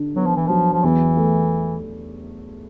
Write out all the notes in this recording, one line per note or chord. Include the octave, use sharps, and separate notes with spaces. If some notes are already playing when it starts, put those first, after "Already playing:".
Already playing: D3 D4
F#3 B3
F3
E3
F3 F#3
F3
E2 E3
A3